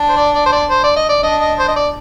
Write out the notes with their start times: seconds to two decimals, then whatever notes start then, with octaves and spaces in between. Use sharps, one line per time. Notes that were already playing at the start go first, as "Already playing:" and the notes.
Already playing: D4
0.09 C5
0.17 D5
0.35 D5
0.46 C5
0.52 D5
0.70 C5
0.84 D5
0.96 D#5
1.09 D5
1.23 D4 D#5
1.41 D#5
1.59 C5
1.68 D#5
1.76 D5